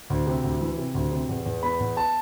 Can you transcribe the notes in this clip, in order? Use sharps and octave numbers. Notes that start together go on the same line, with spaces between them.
D2
C3
D2
E3
C3
D2
C3
E2
E2
B3 B5
E2
A5